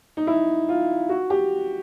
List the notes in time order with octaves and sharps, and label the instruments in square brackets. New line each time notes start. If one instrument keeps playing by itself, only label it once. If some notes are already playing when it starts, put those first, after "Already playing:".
[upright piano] D#4
E4
F4
F#4
G4